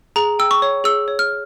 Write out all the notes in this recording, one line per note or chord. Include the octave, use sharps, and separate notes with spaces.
G#4 A#5
G5 E6
C#6
C#5
G#4 E6
C#5
F6